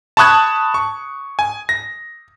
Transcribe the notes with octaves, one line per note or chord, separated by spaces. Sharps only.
A5 B5 C#6 D#6 F#6 G#6
C#6
G#5
A#6